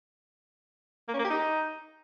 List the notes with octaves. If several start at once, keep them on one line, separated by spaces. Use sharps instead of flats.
A#3
C#4
A#3
G4
D#4